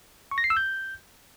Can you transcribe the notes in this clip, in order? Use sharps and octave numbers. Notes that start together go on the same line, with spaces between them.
C#6
A#6
C7
E6
G6